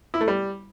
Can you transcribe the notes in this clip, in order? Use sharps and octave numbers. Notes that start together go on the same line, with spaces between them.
E4
A3
G3